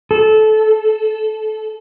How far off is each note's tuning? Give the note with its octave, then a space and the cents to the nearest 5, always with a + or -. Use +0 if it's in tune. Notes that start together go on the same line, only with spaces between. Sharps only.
A4 -20